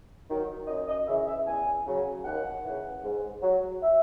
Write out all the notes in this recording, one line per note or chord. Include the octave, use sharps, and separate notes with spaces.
D#3 F#3
F#2 D#5
D#5
C#3 E3 E5
E5
E2 G#5
C#3 F#3
D#2 F#5
C#3 E3
G#2
F#3
E5